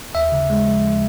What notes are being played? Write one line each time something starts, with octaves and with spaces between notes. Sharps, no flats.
D#2 E5
C#3
G#3
F3